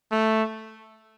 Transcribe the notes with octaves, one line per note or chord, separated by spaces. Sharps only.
A3